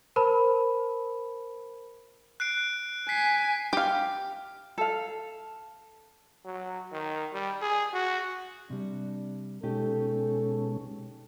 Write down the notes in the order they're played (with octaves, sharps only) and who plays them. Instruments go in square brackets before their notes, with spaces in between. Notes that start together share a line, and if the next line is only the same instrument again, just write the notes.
[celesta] A#4 C5 A5 B5
[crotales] F#6 C7 D7
[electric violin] G#5 [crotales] B6 C7
[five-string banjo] G4 F5
[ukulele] A4 F5
[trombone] F#3
D#3
G3
G#4
F#4
[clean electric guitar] C3 G3 [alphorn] D4
[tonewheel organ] B2 G#3 C#4 [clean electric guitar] D#4 G4 [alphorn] A4